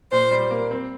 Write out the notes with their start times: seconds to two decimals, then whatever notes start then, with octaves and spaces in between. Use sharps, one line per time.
0.11 A#2 C5
0.31 G3
0.51 A#3
0.71 C4